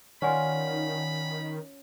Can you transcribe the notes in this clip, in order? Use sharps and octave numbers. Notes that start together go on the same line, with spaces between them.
D#3 C#4 F4 D5 F#5 G#5 B5